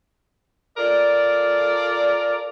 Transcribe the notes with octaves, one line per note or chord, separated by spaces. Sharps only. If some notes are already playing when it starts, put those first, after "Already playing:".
F4 A4 A#4 D5